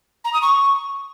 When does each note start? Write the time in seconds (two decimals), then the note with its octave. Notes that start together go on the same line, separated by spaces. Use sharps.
0.25 A#5
0.33 D#6
0.42 C#6